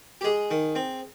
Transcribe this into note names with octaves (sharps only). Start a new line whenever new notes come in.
G4
G#3 G#4
D#3
C4